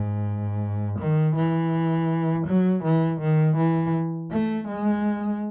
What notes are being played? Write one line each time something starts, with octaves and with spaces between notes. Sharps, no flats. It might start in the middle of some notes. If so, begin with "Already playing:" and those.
Already playing: G#2
D#3
E3
F#3
E3
D#3
E3
A3
G#3